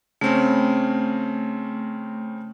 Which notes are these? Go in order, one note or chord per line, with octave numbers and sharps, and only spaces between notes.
C#3 A3 C4 C#4